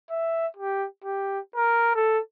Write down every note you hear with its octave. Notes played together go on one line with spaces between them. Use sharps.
E5
G4
G4
A#4
A4